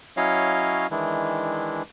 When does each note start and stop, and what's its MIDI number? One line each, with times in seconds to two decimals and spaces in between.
0.17 0.87 54
0.17 0.87 61
0.17 0.87 64
0.17 0.87 73
0.17 0.87 75
0.17 0.87 77
0.91 1.82 51
0.91 1.82 52
0.91 1.82 56
0.91 1.82 62
0.91 1.82 64